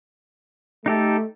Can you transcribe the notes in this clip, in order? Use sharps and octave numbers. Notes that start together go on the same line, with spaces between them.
A3 D#4 G4 A4